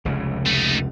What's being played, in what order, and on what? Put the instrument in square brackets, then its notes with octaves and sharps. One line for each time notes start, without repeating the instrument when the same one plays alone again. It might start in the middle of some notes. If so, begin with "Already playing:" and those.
[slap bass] F1 C#2 C#3
[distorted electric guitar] A3 D#4